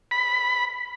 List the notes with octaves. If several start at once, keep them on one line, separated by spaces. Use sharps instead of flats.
B5